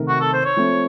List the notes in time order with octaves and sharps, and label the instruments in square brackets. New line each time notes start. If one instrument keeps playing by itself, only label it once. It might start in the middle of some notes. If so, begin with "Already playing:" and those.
Already playing: [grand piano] C3 D#3 A3 D#4 A#4
[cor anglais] F#4
A4
C5
C#5
[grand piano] F3 A3 C4